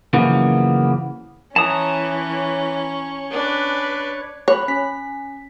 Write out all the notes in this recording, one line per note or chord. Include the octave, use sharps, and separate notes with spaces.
F#2 C#3 E3 F3 A#3 B3
E3 C#4 C#5 A5 A#5 D#6
D4 B4
C#5 B5 F#6
C#4 B6